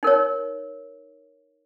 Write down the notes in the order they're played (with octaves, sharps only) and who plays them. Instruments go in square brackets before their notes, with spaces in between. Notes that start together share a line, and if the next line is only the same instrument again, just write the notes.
[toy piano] D#4 A#4 C#5